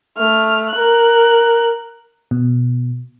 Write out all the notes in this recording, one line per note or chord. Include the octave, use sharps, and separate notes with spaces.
A3 F6
A#4 F#6
B2